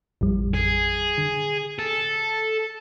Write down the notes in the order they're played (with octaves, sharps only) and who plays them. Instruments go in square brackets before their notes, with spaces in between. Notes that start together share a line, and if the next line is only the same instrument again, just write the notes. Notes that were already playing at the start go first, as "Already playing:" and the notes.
[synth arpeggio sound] A1 F2 G3
[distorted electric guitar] G#4
[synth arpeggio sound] D3
[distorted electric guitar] A4